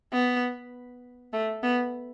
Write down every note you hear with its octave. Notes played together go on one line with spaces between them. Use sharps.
B3
A3
B3